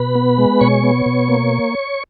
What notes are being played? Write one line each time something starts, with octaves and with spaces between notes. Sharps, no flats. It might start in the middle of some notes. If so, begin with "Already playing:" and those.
Already playing: B2 B4 B5
B3
G#3
B2 C#5 C#6
B3
B2
A#3